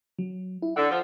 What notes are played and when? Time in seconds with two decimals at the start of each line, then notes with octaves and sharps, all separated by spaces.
0.19 F#3
0.62 E4
0.76 D3 F#5
0.90 F3